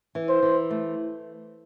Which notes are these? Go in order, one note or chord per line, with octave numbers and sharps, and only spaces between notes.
E3
C5
E3
A3